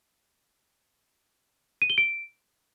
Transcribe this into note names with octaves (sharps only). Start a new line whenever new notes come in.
D#7
G7
D7